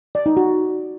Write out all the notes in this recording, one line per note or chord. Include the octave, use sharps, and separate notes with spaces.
D5
D#4
F#4